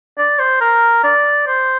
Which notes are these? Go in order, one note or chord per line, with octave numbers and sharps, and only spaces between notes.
D5
C5
A#4
D5
C5